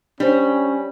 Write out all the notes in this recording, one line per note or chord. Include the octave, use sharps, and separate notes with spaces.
G3 C#4 D4 C5